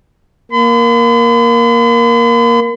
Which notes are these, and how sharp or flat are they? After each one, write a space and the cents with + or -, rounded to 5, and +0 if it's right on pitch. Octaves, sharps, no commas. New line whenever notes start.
A#3 +10 B5 +45